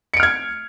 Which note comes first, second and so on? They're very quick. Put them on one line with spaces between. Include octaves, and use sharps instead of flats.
C#7 D7 F6 G#6